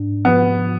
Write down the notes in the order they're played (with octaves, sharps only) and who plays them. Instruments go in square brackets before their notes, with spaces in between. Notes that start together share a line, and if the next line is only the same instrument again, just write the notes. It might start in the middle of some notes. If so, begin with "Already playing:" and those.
Already playing: [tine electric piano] G#2 D4
[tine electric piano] F3 [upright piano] B3